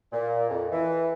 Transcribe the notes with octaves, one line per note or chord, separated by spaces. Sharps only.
A#2
F2
E3